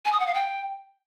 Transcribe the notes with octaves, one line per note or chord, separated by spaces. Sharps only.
G#5
D#6
F#5
F5
G5